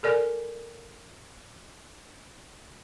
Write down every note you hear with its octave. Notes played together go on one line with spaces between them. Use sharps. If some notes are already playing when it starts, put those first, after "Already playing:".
A4 A#4 D5 G#5